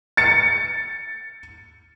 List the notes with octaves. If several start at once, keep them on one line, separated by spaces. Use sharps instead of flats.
A6 C#7